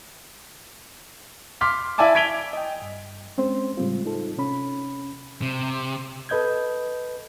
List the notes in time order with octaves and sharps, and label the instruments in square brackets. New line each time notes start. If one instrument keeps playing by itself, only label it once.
[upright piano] C6 D6 F6 B6
E4 D5 E5 G#5 A5 D6
G#6 B6 D7 F7 G7
[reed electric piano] D#5 G5
G2
G#3 C4 C#4 C5
A2 C#3 G3 G#3 C4 F4
D#4 F4 A4
C3 C#4 B5
[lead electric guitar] C3
[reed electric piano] A4 B4 D#5 G6 G#6